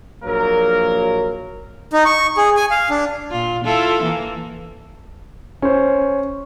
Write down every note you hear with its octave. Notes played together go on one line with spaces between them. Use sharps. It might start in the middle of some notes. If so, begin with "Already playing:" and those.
A#1 F#3 A#3 A#4
D#4
C#6
G#4
G#5
F5
D4
A#2 F4
E4 F4 A4
E3 A#3
C#4 C5